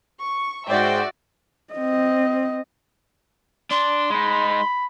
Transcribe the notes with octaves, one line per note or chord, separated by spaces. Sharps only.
C#6
G#2 F#4 C5 D5 E5 G5
C4 D#5
D4 C6
G#3 D#4 B5